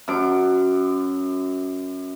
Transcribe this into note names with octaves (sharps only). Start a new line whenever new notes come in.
F#2 D6